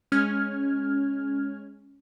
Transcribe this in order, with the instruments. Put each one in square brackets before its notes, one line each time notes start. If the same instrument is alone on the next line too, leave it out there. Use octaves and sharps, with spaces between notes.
[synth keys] G#3 C#4 F6 G#6